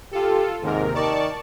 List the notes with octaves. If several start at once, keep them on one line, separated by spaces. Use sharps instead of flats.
F4 G4 A4
D#2 G#2 C3 A#4
D#3 D5 A5 C#6